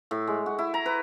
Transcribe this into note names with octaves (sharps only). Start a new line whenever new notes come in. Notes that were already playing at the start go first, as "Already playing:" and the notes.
A2
G#3
F#4
E4
A#5
B4